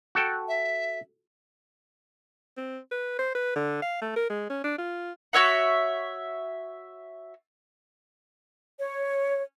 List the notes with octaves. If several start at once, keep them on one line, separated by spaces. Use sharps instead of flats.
F#4 A4 G5
E5
C4
B4
C5
B4
D3
F5
A3
A#4
G#3
C#4
D4
F4
F#4 C#5 E5 F#5
C#5